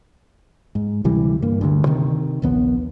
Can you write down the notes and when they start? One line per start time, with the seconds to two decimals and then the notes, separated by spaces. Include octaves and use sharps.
0.75 G#2
1.04 D2 C3 E3 G3
1.42 G2 A#3
1.61 D2 G2 D3
1.86 C3 D#3
2.42 A#1 D#2 B3